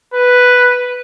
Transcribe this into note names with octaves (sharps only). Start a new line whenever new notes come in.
B4